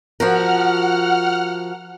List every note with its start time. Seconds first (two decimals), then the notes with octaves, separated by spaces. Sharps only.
0.20 F3 F#4 A#4 F#5 F6